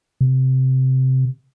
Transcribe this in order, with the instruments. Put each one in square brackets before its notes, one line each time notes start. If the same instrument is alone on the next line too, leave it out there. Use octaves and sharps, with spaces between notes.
[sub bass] C3